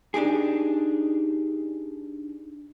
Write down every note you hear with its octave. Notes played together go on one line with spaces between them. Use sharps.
D4 D#4 G4 G#4